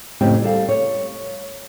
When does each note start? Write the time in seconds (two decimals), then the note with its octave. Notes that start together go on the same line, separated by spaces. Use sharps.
0.21 F2 A2 C#3 C4 G4 G5
0.42 G3 A4 F5
0.69 C#5